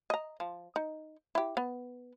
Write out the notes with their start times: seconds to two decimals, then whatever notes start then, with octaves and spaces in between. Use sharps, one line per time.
0.10 D#5 A#5
0.40 F3
0.76 D#4
1.35 E4 G4
1.57 B3